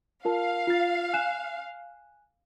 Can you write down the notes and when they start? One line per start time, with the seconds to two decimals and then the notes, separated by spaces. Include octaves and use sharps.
0.25 F4 A#4 F5 A5
0.67 F4 A6
1.13 G#5 F#6 E7